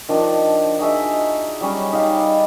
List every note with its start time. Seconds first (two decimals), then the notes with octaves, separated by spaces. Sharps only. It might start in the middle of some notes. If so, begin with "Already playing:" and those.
0.09 D#3 F3 D4
0.79 D#4 F#4 G#4 E5
1.61 F#3 G3 C#4
1.93 D#4 G4 D5 F5
2.24 D5